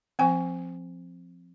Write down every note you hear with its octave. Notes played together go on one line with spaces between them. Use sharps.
F3 C4 G#5